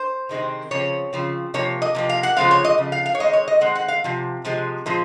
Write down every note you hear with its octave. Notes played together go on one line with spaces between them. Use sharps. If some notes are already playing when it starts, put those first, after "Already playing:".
Already playing: C5
C3 D#3 G#3 C4
C#3 F3 C4 C#5
C#3 F3 C4
C3 F3 A#3 C#5
D#5
C3 F3 A#3
F5
F#5
C#3 F3 G#3 C4 F5
C#5
D#5
C#3 F3
F5
F5
C#5
D#3 G#3 C4 D#5
C#5
D#5
D#3 G#3 C4 F#5
F#5
F5
C3 F3
C3 F3 G#3
A#2 F3 G#3 C4